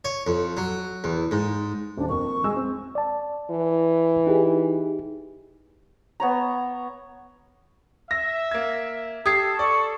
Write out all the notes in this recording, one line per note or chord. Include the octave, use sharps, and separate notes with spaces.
C#5
F2
F#3
E2
G#2
D#1 D4
F2 A#3 C#6
G#3 G#5 E6
C4
D5 A5
E3
D#4 G4 G#4
B3 C#5 A#5
E5 A#6
A#3 G#6
G4 A4 D#6 G#6 C7
D5 C#6